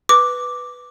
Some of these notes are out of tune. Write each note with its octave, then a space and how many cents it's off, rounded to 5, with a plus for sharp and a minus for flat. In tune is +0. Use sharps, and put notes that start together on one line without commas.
B4 +0 D6 +0